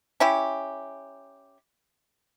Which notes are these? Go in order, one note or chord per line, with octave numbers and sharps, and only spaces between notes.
C#4 E4 G4